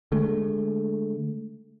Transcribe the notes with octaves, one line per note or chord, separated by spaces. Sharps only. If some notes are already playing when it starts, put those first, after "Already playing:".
D3 G#3 A3